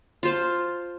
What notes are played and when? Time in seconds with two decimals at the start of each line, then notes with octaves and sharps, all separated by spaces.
0.23 F4 C5 A5